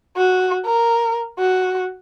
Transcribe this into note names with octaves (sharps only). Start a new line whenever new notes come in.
F#4
A#4
F#4